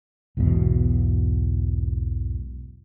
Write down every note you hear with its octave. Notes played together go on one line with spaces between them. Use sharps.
B1 E2 G#2 B2